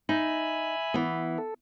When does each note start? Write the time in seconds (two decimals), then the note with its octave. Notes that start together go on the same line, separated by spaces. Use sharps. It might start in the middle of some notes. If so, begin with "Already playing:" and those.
0.09 D#4 E5 G#5 B5
0.94 E3 B3
1.38 A4